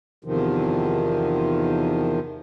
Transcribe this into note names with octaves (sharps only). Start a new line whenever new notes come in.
E2 C3 D#3 F3